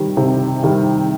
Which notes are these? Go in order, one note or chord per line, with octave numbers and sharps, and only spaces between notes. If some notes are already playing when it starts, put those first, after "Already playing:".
Already playing: C3 D#3 G3
C3
D#3 G3